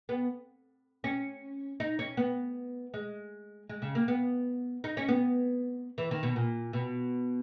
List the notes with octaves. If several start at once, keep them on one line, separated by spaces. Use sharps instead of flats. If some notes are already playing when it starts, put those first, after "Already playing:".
B3
C#4
D#4
C#4
B3
G#3
G#3
C#3
A#3
B3
D#4
C#4
B3
E3
D#3
B2
A#2
B2